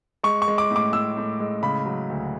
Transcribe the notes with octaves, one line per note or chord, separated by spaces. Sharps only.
G#3 C#6
C#6
G#3
D6
A2
D6
A2 E6
A2
G#3
C#3 B5
F#3
D2